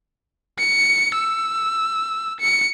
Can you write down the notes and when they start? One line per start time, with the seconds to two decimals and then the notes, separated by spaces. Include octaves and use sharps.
0.59 C#7
1.15 E6
2.40 C#7